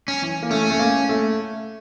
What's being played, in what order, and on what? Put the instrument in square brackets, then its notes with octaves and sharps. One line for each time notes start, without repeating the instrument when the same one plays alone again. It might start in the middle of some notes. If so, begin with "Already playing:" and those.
[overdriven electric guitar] C#4
[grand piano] E3
A#3
[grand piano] A3 [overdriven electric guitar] C#4
[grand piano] A3
A#3
A3